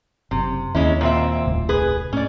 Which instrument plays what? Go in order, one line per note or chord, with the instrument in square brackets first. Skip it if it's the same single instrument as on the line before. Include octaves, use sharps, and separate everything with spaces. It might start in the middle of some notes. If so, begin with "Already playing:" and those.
[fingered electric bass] F#1 [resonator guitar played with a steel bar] C3
[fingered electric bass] D#2 [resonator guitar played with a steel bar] G#3 C#4 E4
[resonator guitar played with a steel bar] A#2 C4 E5
[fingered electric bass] D#1 C2 A2
[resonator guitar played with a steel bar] G#4 B4
[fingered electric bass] A2 [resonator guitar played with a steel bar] C#4 D5